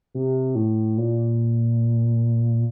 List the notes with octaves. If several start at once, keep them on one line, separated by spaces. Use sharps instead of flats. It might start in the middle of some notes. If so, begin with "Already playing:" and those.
C3
A2
A#2